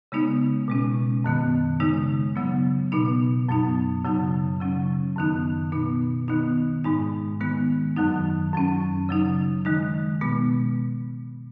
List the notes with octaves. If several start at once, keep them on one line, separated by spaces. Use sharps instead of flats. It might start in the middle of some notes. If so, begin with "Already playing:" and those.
C#3 G#3 B3 D#4
B2 G#3 C#4
F#2 D#3 B3
C#3 G#3 D#4
C#3 F#3 B3
B2 B3 D#4
F#2 F#3 B3 D#4
F#2 C#3 F#3 D#4
C#3 F#3 C#4
F#2 D#3 B3 D#4
B2 B3 D#4
D#3 B3 D#4
G#2 G#3 D#4
D#3 G#3 B3
F#2 D#3 F#3 D#4
F#2 F#3 C#4
C#3 F#3 D#4
D#3 G#3 D#4
B2 G#3 B3